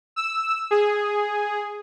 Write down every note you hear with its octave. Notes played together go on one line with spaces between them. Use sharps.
E6
G#4